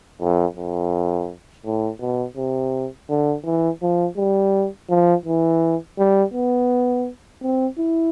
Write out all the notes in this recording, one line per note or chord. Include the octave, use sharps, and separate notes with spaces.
F2
F2
A2
B2
C3
D3
E3
F3
G3
F3
E3
G3
B3
C4
E4